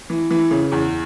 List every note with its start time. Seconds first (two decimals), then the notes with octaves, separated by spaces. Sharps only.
0.10 E3
0.31 E3
0.51 C#3
0.72 E2